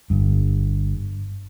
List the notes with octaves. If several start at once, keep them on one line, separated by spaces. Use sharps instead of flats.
G1 G2